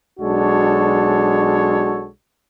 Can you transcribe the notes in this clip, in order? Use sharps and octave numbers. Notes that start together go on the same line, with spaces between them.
B1 G#3 D4 F#4 A4 C#5